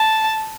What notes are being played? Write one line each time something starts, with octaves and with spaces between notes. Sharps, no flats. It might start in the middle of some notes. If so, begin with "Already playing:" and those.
Already playing: A5